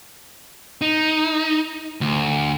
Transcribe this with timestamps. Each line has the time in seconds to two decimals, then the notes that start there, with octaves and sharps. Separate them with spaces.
0.81 D#4
2.01 D2